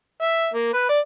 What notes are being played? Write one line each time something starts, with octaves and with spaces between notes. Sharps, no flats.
E5
A#3
B4
D5